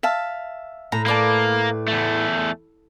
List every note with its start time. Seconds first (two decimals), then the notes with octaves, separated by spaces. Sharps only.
0.03 E5 F5 A5
0.92 A2 A#5
1.06 A#3 B4 D5 A5
1.88 E2 A3